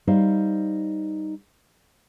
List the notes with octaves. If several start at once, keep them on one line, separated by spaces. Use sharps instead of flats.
G3 D#4 C5 F5